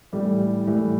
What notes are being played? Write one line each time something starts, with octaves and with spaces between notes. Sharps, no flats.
A2 E3 G3
A2 E3 G3